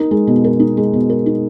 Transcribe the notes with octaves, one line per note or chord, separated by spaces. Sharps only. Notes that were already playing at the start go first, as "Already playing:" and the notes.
Already playing: D#4 A#4
G#3
B2
A#4
D#4
G#3
B2
A#4
D#4